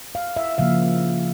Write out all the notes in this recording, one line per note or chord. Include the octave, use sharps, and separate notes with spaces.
F5
E5
C#3 F3 A#3 F5